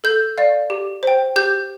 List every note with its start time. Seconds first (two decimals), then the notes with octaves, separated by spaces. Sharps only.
0.04 A4 G6
0.38 D5 F5
0.70 G4
1.03 C5 G5
1.36 G4 G6